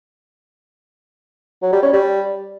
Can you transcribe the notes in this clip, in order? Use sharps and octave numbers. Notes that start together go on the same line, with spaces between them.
F#3
G3
C#4
G3